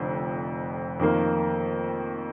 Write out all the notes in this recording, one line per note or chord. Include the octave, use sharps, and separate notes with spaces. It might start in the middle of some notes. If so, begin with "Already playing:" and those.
Already playing: F1 F2 D3
F2 D#3 A#3